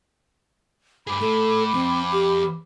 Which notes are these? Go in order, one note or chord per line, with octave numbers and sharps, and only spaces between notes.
G2 G#4 B5 D6
A2 A4
F2 C4
G4